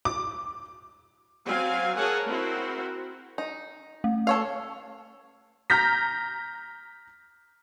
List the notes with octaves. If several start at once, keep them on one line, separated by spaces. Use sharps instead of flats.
D6
F#3 C4 F5 G#5
G#4 A#4 C#5 F#5 G#5 A5
C4 E4 F#4 A#4 C5
D#4
A3
A4 C#5 F5 E6
A#5 F6 G6 A#6 B6